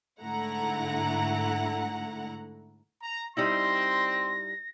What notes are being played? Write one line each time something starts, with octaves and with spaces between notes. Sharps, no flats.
G#2 D3 A3 E4 F#5 A#5
A#5
G3 C4 D#4 E4 C6 A#6